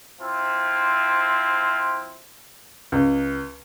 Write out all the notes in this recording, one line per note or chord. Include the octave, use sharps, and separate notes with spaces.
F3 C4 E4 F4
C#2